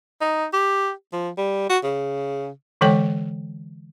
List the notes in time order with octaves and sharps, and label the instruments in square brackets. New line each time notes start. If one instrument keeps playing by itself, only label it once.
[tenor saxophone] D#4
G4
F3
G3
F#4
C#3
[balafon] D3 E3 G#3 A4 C#5 G5